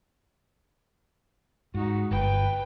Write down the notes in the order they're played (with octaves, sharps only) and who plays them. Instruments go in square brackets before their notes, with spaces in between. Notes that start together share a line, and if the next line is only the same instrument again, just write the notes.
[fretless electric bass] G#2 [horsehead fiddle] D#4 F#4
[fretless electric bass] G1 [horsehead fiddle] B4 G5